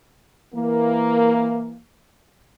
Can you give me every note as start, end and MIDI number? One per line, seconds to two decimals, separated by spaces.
0.55 1.78 52
0.55 1.78 58